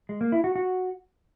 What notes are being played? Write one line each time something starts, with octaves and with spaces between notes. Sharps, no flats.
G#3
A#3
E4
F#4
F#4